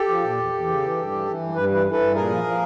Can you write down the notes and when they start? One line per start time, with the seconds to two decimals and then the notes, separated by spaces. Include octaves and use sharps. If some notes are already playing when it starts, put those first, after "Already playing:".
Already playing: G4 A4
0.09 F3
0.23 A#2
0.38 E2
0.53 E2
0.67 C#3
0.82 E3
0.97 G2
1.11 E3
1.26 E3
1.41 G2
1.55 G2 B4
1.70 E3 B4
1.85 E3
1.91 A4 B4
2.00 G2
2.15 A#2 G#4 A#4
2.29 F3
2.44 F3